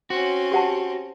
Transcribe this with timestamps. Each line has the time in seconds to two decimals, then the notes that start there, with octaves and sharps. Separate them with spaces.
0.10 C4 C#4 F#4
0.52 G4 F#5 A5